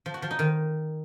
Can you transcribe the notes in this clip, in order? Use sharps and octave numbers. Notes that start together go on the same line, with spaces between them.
F3
F#4
F3
D#4
D#3